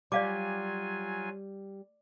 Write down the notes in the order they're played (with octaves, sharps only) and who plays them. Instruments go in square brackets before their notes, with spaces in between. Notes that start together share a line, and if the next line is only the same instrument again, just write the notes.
[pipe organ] F#3 F4 G#5 [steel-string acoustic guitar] G3 [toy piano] D5 F5 D6